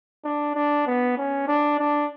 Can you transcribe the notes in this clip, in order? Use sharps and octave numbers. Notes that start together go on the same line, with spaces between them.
D4
D4
B3
C#4
D4
D4